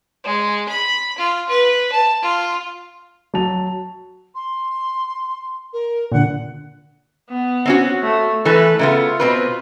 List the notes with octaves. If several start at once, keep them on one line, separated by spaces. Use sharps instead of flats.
G#3
B5
F4
B4
A5
F4
F#3 A5 F7
C6
A#4
A#2 D3 F#5
B3
C4 C#4 F#4
A3
E3 A3 A4 B4
C#3 A3 B3 F4
B2 C4 B4